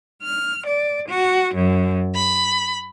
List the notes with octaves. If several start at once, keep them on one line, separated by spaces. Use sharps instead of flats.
F6
D5
F#4
F#2
B5